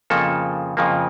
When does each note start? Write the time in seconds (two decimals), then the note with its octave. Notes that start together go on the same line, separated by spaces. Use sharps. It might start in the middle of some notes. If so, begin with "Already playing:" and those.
0.10 F2 C#3 F3 A#3 A4
0.77 F2 C#3 F3 A#3